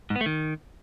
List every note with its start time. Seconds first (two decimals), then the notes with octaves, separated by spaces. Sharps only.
0.10 G#2
0.16 B3
0.21 A3
0.26 D#3